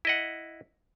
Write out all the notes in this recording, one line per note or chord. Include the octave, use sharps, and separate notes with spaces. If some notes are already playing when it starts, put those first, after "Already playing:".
E4 D#5 F#5